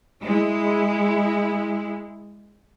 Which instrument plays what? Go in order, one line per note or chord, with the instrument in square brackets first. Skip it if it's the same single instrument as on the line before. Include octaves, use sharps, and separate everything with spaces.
[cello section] G#3 E4